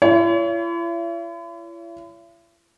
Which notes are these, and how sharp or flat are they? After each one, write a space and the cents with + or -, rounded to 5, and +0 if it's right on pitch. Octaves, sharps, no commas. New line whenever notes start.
E4 +45 C#5 +35